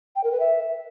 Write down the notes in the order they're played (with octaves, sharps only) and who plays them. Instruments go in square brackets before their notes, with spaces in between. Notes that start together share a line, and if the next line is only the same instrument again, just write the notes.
[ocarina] G5
A#4
B4
E5